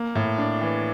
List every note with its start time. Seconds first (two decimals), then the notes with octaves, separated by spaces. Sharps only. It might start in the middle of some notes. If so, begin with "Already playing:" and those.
Already playing: A#3
0.15 A2
0.38 D4
0.61 E3